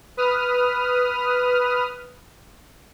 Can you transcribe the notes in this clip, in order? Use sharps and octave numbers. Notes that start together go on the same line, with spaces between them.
B4 D#6 F6